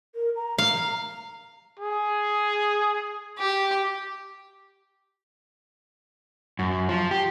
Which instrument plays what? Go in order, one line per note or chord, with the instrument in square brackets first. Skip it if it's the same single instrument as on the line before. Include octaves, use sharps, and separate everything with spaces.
[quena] A#4
A#5
[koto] F5
[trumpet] G#4
[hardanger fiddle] G4
[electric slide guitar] F#2
F3
G4